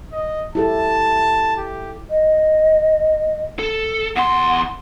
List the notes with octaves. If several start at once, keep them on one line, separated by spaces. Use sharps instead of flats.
D#5
E4 G4 A4 A5
G4
D#5
A4
E2 F#5 C6